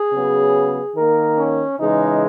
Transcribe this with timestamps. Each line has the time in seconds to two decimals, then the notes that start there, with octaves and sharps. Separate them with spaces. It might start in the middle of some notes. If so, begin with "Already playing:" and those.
Already playing: G#4
0.13 C#3 F#3 B3
0.96 D#3 A#3 A#4
1.38 C#4
1.80 C#3 E3 G#3 D#4